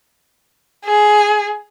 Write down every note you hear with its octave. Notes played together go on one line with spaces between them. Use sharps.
G#4